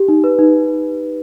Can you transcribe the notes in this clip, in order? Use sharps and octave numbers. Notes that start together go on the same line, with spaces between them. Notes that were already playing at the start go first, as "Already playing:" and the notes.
Already playing: G4
D#4
B4
D#4